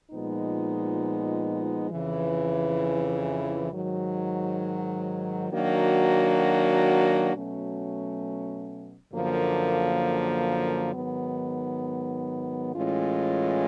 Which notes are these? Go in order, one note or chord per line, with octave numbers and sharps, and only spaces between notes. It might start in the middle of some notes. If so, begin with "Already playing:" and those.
A#2 F3 G#3 B3 D#4
F2 C#3 E3
G#2 D#3 F#3
D#3 F#3 A#3 D4 F#4
B2 F#3 A3 C#4
F#2 D3 F3 A#3
G#2 D#3 F#3 B3
A2 E3 G#3 C#4 F4